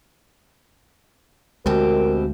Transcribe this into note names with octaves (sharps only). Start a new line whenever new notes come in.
D2 B2 G#3 C4 G4 A#4